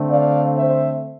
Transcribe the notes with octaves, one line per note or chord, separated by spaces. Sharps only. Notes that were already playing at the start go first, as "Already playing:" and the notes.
Already playing: D3 A3 C4
D5 F5
C5 E5